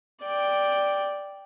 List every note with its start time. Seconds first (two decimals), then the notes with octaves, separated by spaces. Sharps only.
0.22 D5 G5